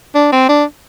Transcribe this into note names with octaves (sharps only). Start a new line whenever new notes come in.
D4
C4
D4